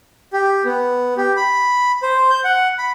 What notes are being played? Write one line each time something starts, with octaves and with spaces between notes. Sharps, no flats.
G4
B3
G4
B5
C5
G6
F#5
B5